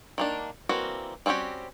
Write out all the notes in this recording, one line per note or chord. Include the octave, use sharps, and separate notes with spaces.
D#3 A#3 D4
E3 G3 A#3 C4 F#4
G3 C4 C#4 F#4 G4